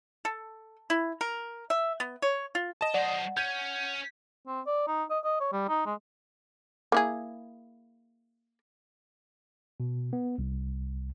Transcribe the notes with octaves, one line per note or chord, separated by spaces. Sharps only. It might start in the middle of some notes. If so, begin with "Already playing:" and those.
A4
E4
A#4
E5
B3
C#5
F4
D#5 A5 E7
F#3 C5 D5 F#5
C#4 G6 G#6 D#7
C4
D5
D#4
D#5
D#5
C#5
G3
D#4
G#3
A#3 E4 G#4
B2
B3
C2